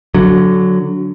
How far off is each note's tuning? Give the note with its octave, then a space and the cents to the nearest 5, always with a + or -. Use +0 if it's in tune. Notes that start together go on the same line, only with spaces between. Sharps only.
D3 -10 F#3 +0